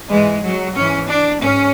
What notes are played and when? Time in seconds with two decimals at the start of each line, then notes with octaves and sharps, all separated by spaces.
0.10 G#2 E3 G#3
0.44 F#3
0.76 G#2 E3 C#4
1.09 D4
1.42 G#2 C#4